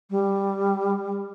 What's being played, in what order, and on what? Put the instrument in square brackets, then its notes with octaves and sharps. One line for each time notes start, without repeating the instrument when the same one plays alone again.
[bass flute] G3